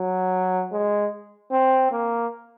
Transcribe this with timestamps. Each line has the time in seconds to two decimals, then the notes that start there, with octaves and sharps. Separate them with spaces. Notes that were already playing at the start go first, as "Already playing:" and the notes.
Already playing: F#3
0.72 G#3
1.51 C4
1.91 A#3